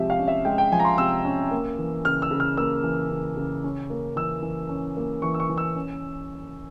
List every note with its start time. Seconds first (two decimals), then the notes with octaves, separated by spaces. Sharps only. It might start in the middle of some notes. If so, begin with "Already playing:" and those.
Already playing: C3 F3 G#3 G4 E5
0.10 F5
0.19 C#4
0.28 E5
0.45 G#3 G5
0.58 G5
0.72 F3 G#5
0.80 A#5
0.85 C6
0.98 C3 E6
1.25 C#4
1.51 A#3
1.78 E3
2.05 C#3 F6
2.22 E6
2.31 C#3
2.40 F6
2.57 A#3 E6
2.84 E3
3.10 C#3
3.37 C#3
3.64 C#4
3.90 A#3
4.16 E3 E6
4.43 E3
4.69 C#4
4.97 A#3
5.22 E3 C#6
5.34 E6
5.40 C#6
5.50 E3
5.58 E6
5.76 C#4